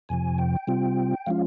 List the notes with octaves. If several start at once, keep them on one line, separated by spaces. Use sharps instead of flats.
F2 C3 F3 G#5
G5
C3 G3 C4 F4
F3 G#3 C#4 F4 F5